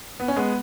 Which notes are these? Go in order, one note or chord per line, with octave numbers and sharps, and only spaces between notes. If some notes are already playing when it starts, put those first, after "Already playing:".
B3
C#4
G#3 B3